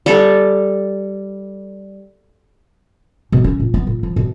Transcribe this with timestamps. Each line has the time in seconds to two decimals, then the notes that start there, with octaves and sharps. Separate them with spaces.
0.06 G3 A4
3.32 B2
3.44 C#4
3.60 A#2
3.74 B3
3.87 A#2
4.03 F3
4.16 B2